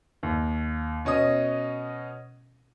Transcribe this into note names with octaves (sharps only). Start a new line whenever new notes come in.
D#2
B2 C#4 D#5 D#6